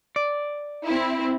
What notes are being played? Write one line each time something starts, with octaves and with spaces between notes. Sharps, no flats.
D5
C4 E4